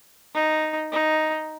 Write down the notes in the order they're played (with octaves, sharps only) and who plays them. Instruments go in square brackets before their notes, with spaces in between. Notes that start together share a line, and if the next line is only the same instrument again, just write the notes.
[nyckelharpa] D#4
D#4